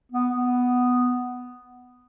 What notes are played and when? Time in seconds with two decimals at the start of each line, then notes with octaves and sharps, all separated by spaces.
0.12 B3
0.35 B3